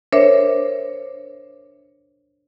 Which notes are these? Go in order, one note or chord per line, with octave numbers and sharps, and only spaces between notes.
D4 A#4 C5 C#5 E5